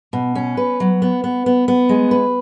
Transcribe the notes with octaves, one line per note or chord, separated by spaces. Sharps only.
B2
C#4
B4
F#3
B3
B3
B3
B3
G#3
B4